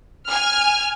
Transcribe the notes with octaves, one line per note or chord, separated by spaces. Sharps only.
G#5 F6